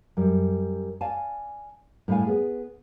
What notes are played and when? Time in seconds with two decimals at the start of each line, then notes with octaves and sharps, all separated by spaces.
0.17 F#2 G3
1.01 D5 F5 G#5 A5
2.08 A2 G3 C#5 F5 G#5
2.26 B3 G#4